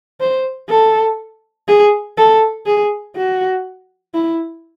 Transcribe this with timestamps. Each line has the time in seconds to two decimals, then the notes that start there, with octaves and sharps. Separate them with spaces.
0.20 C5
0.70 A4
1.68 G#4
2.18 A4
2.66 G#4
3.16 F#4
4.14 E4